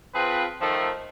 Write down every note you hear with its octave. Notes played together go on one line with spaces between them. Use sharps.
F3 C4 F4 G#4 B4
D#3 F3 A3